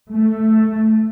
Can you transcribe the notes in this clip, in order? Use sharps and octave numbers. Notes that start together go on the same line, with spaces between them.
A3